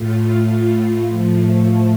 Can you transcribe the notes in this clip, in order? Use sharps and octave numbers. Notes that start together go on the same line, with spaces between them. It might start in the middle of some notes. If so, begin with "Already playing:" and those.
Already playing: A2 A3 F4
A2 F3 A3